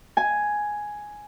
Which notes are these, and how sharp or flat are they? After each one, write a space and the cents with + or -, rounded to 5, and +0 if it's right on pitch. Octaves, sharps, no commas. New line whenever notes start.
G#5 +5